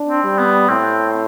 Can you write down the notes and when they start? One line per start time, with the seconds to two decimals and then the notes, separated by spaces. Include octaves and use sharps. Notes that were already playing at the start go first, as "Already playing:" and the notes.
Already playing: D4
0.09 C4
0.24 G3
0.39 B3
0.69 A2 C4